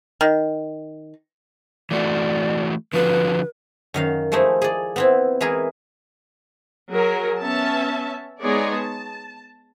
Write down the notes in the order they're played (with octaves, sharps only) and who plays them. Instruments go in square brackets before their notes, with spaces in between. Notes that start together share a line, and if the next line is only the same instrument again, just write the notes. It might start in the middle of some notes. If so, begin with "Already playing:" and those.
[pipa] D#3
[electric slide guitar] E3 A3 F#4 [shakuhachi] D5
[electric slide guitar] D3 F3 F#4 [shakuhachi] B4
[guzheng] F#2 D#3 F5
F3 G#3 A3 D#4 E4
G#4 D5
B3 C4 E4
E3 G#3 E4 G#4 A#4
[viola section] F#3 G#4 A#4
B3 C#4 E5 A5
G#3 B3 D#4 G#4 C#5 D5
A5